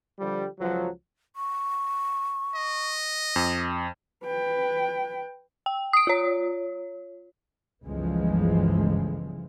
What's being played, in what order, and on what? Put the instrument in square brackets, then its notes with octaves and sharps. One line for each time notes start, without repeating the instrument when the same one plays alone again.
[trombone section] D3 F3 G3
C#2 F3 F#3
[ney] C#6
[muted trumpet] D#5
[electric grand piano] F2
[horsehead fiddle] B4 G5
[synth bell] G5
D#6 D7
F4 C#5
[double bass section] G1 C#2 E3 F3 G#3